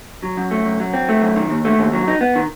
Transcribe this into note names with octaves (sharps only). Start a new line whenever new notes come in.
F#3
F#2
A3
F#2
F#3
C4
A3
F#2
D#3
D#2
A3
D#2
F#3
D#4
B3
D#3